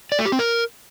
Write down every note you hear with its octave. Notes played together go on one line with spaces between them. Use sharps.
D5
A3
G4
C4
A#4